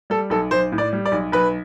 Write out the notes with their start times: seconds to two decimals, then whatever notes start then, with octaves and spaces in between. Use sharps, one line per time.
0.10 G3 A4
0.30 B1 A4
0.51 B1 C5
0.72 A2
0.78 D5
0.93 G3
1.06 D5
1.12 B1
1.32 B1 B4